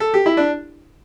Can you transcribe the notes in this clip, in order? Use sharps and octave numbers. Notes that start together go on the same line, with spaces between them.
A4
G4
E4
D4